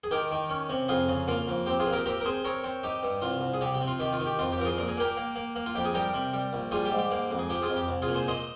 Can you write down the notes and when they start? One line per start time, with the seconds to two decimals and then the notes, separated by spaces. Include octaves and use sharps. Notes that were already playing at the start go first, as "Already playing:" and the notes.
0.04 G#4
0.11 D#3 G4 A#4
0.31 D#3
0.50 C#4
0.69 C3
0.88 F2 F4 G#4
1.08 C#3
1.28 A#3 F4
1.47 F2
1.66 C4 G4
1.79 F4 G#4
1.86 A#2
1.92 G4 A#4
2.06 C4 G4 A#4
2.20 A#4
2.25 C4 G#4 C5
2.44 C4 A#4 C#5
2.64 C4
2.83 D#4 G4
3.03 G2
3.22 C2 F4
3.41 C2
3.54 G#4
3.61 C3 G4
3.74 G4
3.81 C3
3.87 F4
3.99 D#3 G4
4.13 F4
4.20 D#3
4.26 G4
4.39 F2 F4
4.52 G4
4.58 F2 A#4
4.65 F4 G#4
4.78 A#2 A#4
4.88 G#4
4.97 A#3 G4 A#4
5.17 A#3
5.35 A#3
5.55 A#3
5.66 F4
5.75 F2 G4
5.85 G#4
5.94 G3 G4 A#4
6.14 C3
6.33 G3
6.53 A#1
6.71 G3 F4 G#4
6.85 G4
6.91 G#2
6.98 G4
7.11 A#3
7.31 F2
7.39 G#4
7.50 F3 G4
7.62 F4 G#4
7.69 F2
7.76 G4
7.88 C2
8.02 F4 G#4
8.08 A#2
8.15 G#4 C5
8.27 A#2 C5 D#5